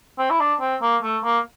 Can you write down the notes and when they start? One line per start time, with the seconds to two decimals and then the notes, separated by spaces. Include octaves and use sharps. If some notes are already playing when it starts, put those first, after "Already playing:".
0.18 C4
0.30 E4
0.39 D4
0.61 C4
0.82 A#3
1.02 A3
1.24 A#3